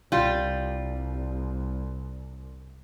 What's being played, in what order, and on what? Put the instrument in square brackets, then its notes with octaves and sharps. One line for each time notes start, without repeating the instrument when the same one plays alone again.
[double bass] C2 [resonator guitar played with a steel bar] G3 F4